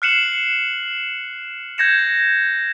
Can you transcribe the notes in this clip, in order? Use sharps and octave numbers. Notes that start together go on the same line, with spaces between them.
F6 F#6 C7 C#7 E7 F#7
G6 G#6 A#6 C#7 E7